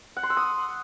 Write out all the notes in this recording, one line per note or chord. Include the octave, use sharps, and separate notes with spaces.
F#5
C6
E6
D#6